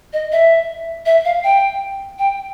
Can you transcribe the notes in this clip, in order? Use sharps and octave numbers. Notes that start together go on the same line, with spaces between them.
D#5
E5
E5
F5
G5
G5